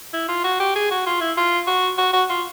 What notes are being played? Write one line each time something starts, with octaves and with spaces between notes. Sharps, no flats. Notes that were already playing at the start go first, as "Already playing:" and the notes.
E4
F4
F#4
G4
G#4
F#4
F4
E4
F4
F#4
F#4
F#4
F4